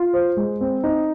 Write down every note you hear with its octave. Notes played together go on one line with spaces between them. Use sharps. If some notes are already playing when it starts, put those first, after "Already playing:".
Already playing: F4
C5
G#3
C4
D#4